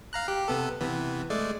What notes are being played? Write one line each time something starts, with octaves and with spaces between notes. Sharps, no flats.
F5 A#5 F#6
G4
C3 B3 A4
C3 E3 B3
G#3 A3 D5